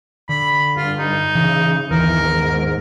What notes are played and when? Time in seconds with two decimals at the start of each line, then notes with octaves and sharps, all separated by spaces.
0.29 D3 B5
0.76 G2 F4
0.98 D#4
1.35 C#3 E3
1.91 G1 D#2 E3 A#4
2.21 G#2